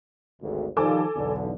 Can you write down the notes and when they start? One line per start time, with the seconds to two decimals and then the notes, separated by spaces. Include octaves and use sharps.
0.42 G#1 D2
0.77 D#3 F3 G3 A4 G#5 D6
1.16 B1 E2 D3